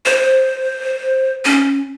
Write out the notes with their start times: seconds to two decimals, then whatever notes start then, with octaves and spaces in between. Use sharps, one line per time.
0.06 C5
1.45 C#4